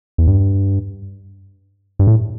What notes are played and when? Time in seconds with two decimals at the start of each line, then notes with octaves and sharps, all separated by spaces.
0.18 E2
0.27 G2
1.99 G2
2.07 A2